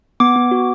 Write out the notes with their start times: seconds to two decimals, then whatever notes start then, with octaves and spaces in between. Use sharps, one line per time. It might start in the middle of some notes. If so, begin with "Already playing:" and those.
0.20 B3 D6
0.36 B3
0.51 F#4